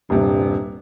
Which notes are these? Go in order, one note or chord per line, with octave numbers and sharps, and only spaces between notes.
D#1 G2 C3